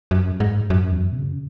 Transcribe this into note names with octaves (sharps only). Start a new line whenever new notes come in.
F#2
G#2
F#2
E2
F#2
B2
C#3